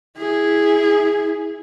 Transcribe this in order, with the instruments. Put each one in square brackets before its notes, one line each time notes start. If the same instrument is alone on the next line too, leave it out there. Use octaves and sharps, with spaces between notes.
[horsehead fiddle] E4 G#4